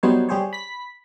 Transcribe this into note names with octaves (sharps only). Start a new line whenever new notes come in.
F#3 G3 B3 D#4 C5 C#5
G3 G4 G#4 C5 C#5
B5 B6